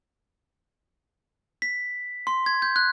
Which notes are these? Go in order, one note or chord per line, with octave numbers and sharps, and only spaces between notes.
B6
C6
G#6
G6
F#6